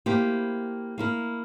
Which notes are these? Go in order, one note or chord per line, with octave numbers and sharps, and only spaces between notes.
A#3 E4 G4 C5
A#3 E4 A#4